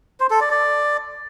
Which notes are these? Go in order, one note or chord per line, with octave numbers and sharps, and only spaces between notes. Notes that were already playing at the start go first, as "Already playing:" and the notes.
C5
A4
D5
D5